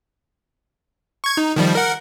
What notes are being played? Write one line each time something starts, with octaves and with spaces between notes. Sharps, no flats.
C#6 G#6
D#4
D#3 F3 G3
A#4 F#5